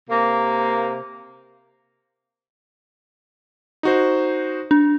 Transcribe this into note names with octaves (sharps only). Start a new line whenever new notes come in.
C3 A#3
D#4 F#4 C5
D4